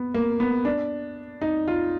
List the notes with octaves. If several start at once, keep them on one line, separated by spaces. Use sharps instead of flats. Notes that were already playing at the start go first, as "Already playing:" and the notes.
Already playing: B3
A#3
B3
D4
D#4
F4